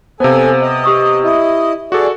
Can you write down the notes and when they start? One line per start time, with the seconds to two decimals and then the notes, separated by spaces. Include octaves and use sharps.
0.20 C3 B3 A4 C5 F5 G#5
0.62 D#5
0.84 G4 C#6 D#6
1.24 E4 D#5
1.92 F#4 G#4 A4 D5